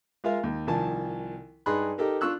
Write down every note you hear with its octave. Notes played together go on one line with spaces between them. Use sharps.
G#3 F4 A#4 E5 F5
D#2
C2 D#3 F3 G#5 A5
G2 D#4 G#4 B5 C6 F#6
D#4 G4 A4 A#4
D4 F4 C#6 E6 F#6